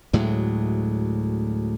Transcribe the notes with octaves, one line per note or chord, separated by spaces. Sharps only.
D2 A2 F#3 G#3